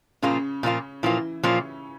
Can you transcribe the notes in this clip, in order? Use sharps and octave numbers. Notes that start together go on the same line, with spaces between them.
A#2 C#3 F3 A#3 C#4 F4
A#2 F3 A#3 F4
A#2 E3 F3 A#3 E4 F4
A#2 C#3 F3 A#3 C#4 F4